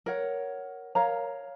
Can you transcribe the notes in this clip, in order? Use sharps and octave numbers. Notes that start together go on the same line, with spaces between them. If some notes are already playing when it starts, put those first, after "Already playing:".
A#4 C#5 F#5
A#4 C#5 F5 A#5